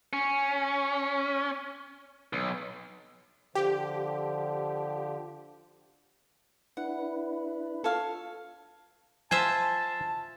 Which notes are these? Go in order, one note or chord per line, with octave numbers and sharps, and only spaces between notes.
C#4
B1
D3 F3 G4
D4 E4 B4 F#5
F4 A4 C#5 F5
F4 C5 E5 G#5 A5